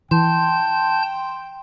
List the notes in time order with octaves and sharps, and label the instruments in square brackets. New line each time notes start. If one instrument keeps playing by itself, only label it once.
[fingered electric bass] E3 [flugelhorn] G5 [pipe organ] A5 G6 [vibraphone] C6